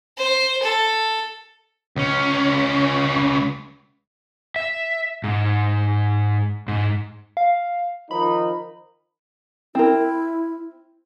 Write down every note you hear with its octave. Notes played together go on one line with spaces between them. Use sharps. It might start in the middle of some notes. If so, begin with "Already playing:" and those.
C5
A4
C#2 C#4
E5
G#2
G#2
F5
D#3 F3 D#4 B5
C4 E4 A#4